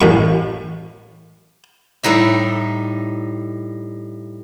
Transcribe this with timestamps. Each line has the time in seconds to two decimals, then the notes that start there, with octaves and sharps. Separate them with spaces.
0.01 A1 F#2 C#6
2.03 A2 G3 D#4 E5